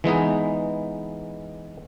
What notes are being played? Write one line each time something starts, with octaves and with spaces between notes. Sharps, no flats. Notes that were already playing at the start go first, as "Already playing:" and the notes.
E3 G#3 B3 D#4